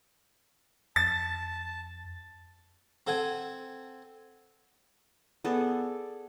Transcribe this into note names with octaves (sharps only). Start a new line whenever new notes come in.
F2 A5 A6
C4 A4 F#5 G#5
B3 G#4 A4 D5